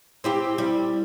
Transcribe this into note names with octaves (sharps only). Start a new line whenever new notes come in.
C4 E4 G4
G3